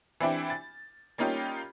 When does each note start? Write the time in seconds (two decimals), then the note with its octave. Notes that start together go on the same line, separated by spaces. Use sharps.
0.20 E3 C4 D4 E4 G4
0.50 A6
1.18 G3 A#3 C#4 D#4 F4 G4